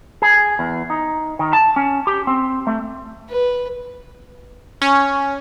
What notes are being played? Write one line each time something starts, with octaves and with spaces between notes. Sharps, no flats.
G#4
E2
D#4
D#3
A5
C#4
G4
C4
A3
B4
C#4